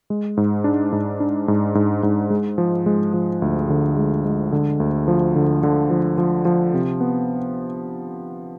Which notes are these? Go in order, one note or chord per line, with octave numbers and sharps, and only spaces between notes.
G#3
G#2
D4
G#2
D4
G#2
G#2
G#2
G#3
F3
G#3
F3
D2
D3
G#3
G#3
D3
D2
F3
D3
D3
F3
F3
F3
C3
B3